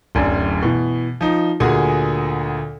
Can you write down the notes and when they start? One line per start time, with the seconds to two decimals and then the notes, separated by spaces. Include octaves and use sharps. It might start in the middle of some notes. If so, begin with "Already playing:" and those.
0.15 D1 F#2 D4
0.63 B2 E3
1.21 F3 D#4
1.60 D2 A#2 F#4 G#4 G#5